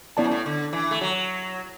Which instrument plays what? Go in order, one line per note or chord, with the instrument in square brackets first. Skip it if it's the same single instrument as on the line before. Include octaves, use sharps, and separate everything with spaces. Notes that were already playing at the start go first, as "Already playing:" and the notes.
[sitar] A2 [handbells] B3 E4 D5 A5
[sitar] F#2
A2
D3
E3
A3
F#3